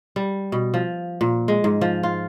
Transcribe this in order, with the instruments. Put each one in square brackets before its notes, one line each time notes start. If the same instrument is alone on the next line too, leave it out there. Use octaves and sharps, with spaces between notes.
[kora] G3
B2
F3
A#2
G#3
G#2
F3
F4